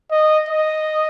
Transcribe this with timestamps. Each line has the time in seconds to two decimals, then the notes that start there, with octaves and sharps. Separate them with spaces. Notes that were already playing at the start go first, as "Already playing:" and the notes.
0.11 D#5
0.49 D#5